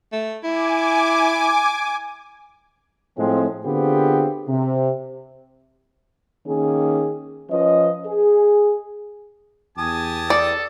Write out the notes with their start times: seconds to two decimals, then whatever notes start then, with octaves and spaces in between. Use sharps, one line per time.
0.13 A3
0.43 E4 G#5 D6
3.17 A2 F3 G#3 C4
3.64 D3 B3 C4 F4 G4 G#4
4.48 C3
6.47 D#3 A#3 C#4 G#4
7.50 F3 C#4 B4 D#5
8.06 G#4
9.78 E2 G4 G#5 A5 D#6
10.30 A4 D5